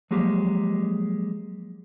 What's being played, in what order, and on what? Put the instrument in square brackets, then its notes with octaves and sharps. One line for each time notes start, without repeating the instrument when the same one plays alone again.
[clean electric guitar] F3 F#3 G#3 A#3 G4